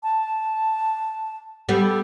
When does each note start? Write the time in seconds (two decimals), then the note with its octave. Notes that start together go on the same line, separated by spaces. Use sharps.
0.03 A5
1.69 G3 B3 A4